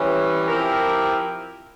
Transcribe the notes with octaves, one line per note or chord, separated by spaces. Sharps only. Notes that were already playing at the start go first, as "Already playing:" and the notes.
Already playing: E3 G3 C#4
F3 C4 E4 G4 A#4